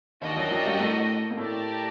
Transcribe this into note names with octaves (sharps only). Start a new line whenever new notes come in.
D#2 D#3 D4 F#4 A#4 D#5 G5
F#2 F#3
F#2 F#3
G2 G3
A2 A3
A#3
A2 A3 G4 A#4 D5 A5